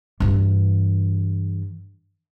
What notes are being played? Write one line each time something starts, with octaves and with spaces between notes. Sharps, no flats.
G2 E3